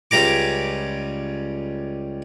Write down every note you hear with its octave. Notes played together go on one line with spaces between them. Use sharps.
C#2 G3 A#5 D6